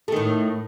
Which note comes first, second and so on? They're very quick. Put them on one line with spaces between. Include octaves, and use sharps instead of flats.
A3 D#3 A2